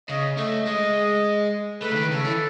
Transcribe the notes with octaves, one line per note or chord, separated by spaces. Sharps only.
C#3 D#5
A3 D#5
G#3
A3 B4
C#3
D#3
C#3 A4
E3